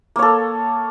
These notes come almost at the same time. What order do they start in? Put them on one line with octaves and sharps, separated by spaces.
A#3 C#5 A4